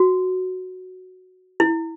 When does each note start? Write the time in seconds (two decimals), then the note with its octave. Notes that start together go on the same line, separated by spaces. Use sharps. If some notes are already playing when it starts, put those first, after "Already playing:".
Already playing: F#4
1.60 E4